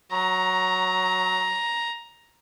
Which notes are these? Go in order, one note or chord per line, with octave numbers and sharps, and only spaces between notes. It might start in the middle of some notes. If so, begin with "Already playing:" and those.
F#3 A#5